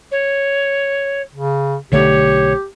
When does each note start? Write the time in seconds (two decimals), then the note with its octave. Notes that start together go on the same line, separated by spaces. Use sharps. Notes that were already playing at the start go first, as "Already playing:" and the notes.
0.11 C#5
1.35 C#3
1.92 B1 D3 A3 G4 C#5